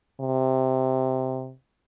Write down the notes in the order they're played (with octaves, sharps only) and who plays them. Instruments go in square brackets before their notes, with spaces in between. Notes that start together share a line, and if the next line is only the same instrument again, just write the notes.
[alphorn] C3